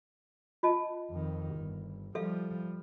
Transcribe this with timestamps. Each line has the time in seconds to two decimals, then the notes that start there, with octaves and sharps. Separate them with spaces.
0.63 F4 D#5 A5
1.11 F2 D#3
1.56 G1
2.15 F3 G3 A4 E5 F5